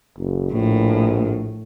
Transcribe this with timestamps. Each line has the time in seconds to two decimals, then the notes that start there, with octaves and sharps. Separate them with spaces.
0.17 F#1
0.52 A#1 A2